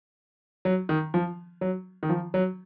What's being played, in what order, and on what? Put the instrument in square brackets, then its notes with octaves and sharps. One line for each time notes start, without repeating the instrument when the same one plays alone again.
[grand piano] F#3
D#3
F3
F#3
D#3
F3
F#3